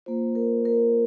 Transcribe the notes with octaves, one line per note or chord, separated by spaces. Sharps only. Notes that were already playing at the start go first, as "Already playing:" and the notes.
A#3 F4 C5
A#4
A#4